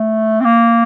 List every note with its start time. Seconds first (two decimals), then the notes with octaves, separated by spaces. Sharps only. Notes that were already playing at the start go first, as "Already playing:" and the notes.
Already playing: A3
0.40 C4
0.44 A#3